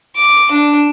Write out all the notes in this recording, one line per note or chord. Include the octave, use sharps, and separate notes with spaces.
D6
D4